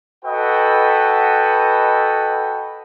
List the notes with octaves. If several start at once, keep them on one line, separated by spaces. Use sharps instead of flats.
F#4 A4 B4 D#5 F#5 G5